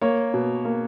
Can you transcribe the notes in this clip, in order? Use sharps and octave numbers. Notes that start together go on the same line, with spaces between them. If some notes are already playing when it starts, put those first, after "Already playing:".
A#3 C#5
B2
A#3